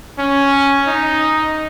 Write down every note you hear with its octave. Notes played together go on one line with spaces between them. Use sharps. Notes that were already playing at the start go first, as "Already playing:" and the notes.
C#4
D#4